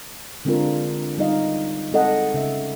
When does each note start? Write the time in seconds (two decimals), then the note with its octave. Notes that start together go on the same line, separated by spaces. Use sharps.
0.45 D3 G#3 C4 D4 F4 A#4
1.18 G3 D#4 D#5 F5
1.92 G#3 C4 A4 D#5 F#5
2.34 C#3 E5